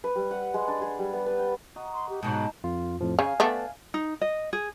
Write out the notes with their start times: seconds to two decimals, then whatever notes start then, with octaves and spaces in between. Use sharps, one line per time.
0.04 B4
0.16 G3
0.31 F#5
0.54 G#3
0.67 D4
0.82 G#4
0.99 G3
1.13 B3
1.26 B4
1.39 G5
1.76 F#4 D#5 A#5
1.94 C6
2.09 G4
2.23 G#2 B2 F#3 D#4 A5
2.64 F2 F4
3.01 F2 A2 F3
3.19 C#3 F5 G#5
3.40 A3 B3 D4
3.94 D#4
4.21 D#5
4.53 G#4